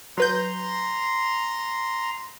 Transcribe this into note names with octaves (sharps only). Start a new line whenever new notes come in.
F#3 B4 A#5 C6 G6